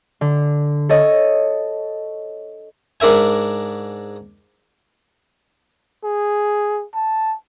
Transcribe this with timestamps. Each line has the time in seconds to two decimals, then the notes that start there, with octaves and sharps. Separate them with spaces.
0.21 D3
0.89 A4 C#5 D#5
3.00 G#2 D4 A#4 E5 G#5
6.04 G#4
6.95 A5